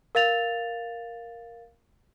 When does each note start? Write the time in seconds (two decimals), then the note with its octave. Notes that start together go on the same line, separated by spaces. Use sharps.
0.15 A#4 F5 A6 F7